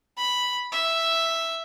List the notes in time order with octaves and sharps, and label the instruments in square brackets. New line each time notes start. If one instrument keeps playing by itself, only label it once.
[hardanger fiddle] B5
E5